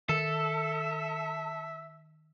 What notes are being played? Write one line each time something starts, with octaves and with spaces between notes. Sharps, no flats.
D#3 A4 E5